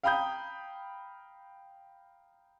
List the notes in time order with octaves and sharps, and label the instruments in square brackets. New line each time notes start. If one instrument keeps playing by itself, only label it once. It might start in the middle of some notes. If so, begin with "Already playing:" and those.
[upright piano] F5 G5 A#5 B5 D#6 G6